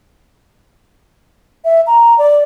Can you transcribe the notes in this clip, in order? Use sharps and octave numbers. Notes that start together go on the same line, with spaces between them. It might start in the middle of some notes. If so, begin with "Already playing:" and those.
E5
A#5
D5